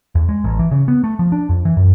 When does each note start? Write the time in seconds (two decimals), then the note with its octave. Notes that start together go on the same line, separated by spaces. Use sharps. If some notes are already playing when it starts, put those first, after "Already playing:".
0.15 E2
0.29 G#3
0.44 A1
0.59 E3
0.71 C#3
0.88 B3
1.04 A3
1.19 F3
1.32 D4
1.49 F2
1.65 E3
1.77 F#2